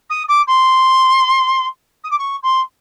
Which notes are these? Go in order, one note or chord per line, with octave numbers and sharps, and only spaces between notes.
D#6
D6
C6
D#6
D6
C#6
C6